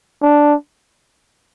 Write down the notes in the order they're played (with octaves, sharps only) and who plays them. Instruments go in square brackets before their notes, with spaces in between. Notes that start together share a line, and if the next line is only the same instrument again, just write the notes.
[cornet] D4